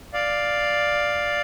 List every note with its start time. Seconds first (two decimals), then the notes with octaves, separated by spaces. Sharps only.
0.13 D5 F5